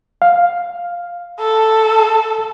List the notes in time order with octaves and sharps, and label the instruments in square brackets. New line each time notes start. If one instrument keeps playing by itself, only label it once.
[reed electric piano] F5
[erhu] A4